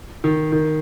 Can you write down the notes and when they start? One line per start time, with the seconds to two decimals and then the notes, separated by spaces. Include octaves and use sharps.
0.24 D#3
0.52 D#3